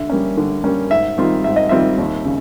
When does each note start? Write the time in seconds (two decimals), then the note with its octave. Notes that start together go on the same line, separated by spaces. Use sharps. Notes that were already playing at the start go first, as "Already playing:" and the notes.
Already playing: D3 E5
0.10 G3 A#3 C#4
0.37 D3
0.64 G3 A#3 C#4
0.91 G#2 E5
1.18 D#3 G3 C4 F4
1.44 G#2 E5
1.56 D#5
1.69 D#3 G3 C4 F4 E5
1.98 D#2
2.25 C#3